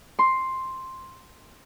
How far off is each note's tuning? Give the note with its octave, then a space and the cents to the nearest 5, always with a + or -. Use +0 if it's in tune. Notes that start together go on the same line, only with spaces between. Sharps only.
C6 +5